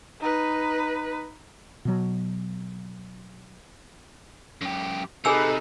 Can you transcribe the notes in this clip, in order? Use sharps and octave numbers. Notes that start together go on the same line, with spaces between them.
D#4 B4
B2 F#3
F#2 G4
C3 D#4 G#4 A4 B4 G#5 E6